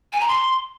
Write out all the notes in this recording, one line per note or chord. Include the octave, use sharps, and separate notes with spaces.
G#5
A#5
C6